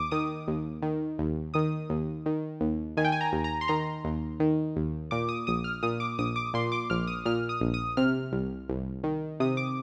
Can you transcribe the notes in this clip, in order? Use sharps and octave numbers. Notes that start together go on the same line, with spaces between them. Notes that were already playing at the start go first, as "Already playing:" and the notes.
Already playing: D#2 D6 D#6
D#3 D#6
D#2
D#3
D#2
D#3 D#6
D#2
D#3
D#2
D#3 G#5
G5
G#5
A#5
D#2
A#5
C6
D#3 A#5
D#2
D#3
D#2
A#2 D6
D#6
A#1 D#6
F6
A#2 D#6
D6
A#1 D#6
D6
A#2 C6
D6
A#1 F6
D#6
A#2 F6
D#6
A#1
D#6
C3 F6
C2
C2
D#3
C3 D#6
D6